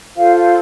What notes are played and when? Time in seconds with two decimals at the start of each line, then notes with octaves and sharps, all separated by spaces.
0.15 F4 A4 C5 F5
0.35 F5